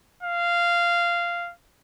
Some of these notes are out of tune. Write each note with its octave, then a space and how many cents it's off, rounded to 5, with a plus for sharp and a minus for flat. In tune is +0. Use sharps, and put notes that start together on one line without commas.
F5 -10